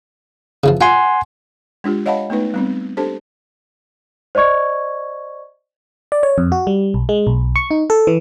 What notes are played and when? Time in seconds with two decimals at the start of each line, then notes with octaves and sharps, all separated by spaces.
0.64 C#3 E3 F3
0.81 F4 F#5 G#5 C6
1.84 G#3 D4 F4 G4
2.06 C#5 D#5 F5 F#5 A5 B5
2.30 A3 B3 D#4 B4
2.54 G3 B3 C4
2.97 D4 G4 A4 C5 A5
4.35 C5 D5 D#5 C#6 G#6
6.12 D5
6.23 C#5
6.38 F2
6.52 F#4
6.67 G3
6.94 B1
7.09 G#3
7.27 B1
7.56 C#6
7.71 D#4
7.90 A4
8.07 E3